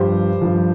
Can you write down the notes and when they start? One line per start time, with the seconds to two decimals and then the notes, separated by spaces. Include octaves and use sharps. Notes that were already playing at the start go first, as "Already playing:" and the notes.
Already playing: G2 F3 G4 C5
0.42 G2 F3